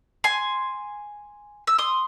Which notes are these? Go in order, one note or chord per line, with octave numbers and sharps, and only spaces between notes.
G#5 C6
E6
C6 D#6